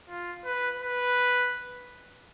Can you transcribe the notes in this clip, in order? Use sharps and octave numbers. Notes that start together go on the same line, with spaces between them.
F4
B4
B4